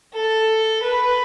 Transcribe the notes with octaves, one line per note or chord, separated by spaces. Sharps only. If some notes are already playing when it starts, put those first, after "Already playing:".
A4
B4